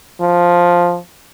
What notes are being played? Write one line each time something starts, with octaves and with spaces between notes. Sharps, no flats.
F3